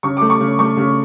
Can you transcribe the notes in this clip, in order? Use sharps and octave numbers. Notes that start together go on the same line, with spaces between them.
C#3 C#6
A3 D6
C#6
C#3
A3 C#6
C#3